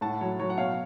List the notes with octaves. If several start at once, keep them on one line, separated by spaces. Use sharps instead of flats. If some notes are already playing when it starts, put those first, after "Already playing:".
A2 F#5 A5
F#3 C#5
F#3 C#5
F#5
B2 C#5 F5